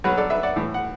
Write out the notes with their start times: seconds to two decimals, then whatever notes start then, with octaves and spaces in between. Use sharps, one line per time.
0.04 B2 F#3 F#4 B4
0.17 A4 D5
0.30 B4 E5
0.43 D5 F#5
0.56 A2 E3
0.74 F#5